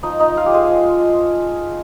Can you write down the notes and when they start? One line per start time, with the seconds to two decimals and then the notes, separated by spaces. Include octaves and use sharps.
0.03 F3 D#4 D#5
0.20 D#4 D#5
0.37 F3 F4 F5
0.46 G4
0.53 G#3 G#4
0.71 F3